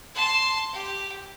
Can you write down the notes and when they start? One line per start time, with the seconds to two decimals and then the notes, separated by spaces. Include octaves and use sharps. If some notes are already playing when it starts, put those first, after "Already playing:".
0.15 A5 C6
0.73 G4